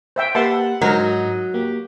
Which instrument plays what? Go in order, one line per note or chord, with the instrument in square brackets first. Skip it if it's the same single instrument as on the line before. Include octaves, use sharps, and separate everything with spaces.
[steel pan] C5 E5 G5
[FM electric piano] A#3 G4 B4 [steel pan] E5 A5 C6 [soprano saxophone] F#5
[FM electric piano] G#2 [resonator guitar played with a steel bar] F#3 [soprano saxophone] D#4 [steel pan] A#4 C5
[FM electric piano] A#3 [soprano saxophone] G4